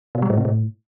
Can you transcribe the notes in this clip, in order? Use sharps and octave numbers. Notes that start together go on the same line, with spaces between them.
B2
G3
A2
C3
A2